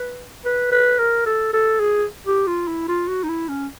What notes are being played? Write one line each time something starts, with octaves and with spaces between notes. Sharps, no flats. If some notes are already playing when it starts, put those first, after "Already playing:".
Already playing: B4
B4
B4
A#4
A4
A4
G#4
G4
F4
E4
F4
F#4
D#4
E4
C#4